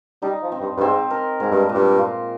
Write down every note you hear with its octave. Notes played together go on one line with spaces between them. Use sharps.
G3 D#4
F3
C4
G2
G2
G#2 C4
A#4
G#2 G#3
G2
A#2
G2
F4